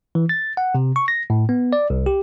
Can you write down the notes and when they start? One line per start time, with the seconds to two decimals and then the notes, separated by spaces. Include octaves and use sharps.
0.15 E3
0.29 A6
0.57 F#5
0.75 C3
0.96 C#6
1.08 A#6
1.30 A2
1.49 B3
1.73 D5
1.90 C2
2.06 G4